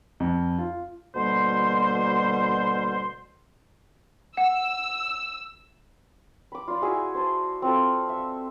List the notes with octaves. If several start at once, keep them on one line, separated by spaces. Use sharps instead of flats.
F2
F4
D2 B2 G3 A#3 C5 C6
F#5 E6
B5 D6
F4 D5
E4 F#4 G#4 E5
C5 A5
C4 F4 A4
E5